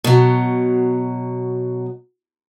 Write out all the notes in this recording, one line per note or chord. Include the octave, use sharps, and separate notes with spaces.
B2 F#3